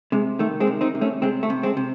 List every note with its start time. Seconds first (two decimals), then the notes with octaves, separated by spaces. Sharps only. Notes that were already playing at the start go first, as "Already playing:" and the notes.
0.12 C3 G#3
0.39 D#3 A3
0.60 G#3 C4
0.67 C3
0.81 C4 D#4
0.95 C3
1.01 A3 C#4
1.22 C3 G#3 C4
1.43 A3
1.50 C3
1.63 G#3 C4
1.77 C3